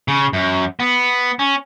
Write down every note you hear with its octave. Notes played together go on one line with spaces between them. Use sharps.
C#3
F#2
B3
C#4